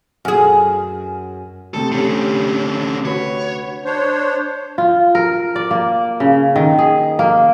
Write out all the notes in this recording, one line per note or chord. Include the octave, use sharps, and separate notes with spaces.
F#2 G#4
D2 C3 A4
D3 C#4 G4
F#4 B4 C#5
D4 C5 C#5
F4
A#4
D5
A#3
C#3
D#3
G#4
A#3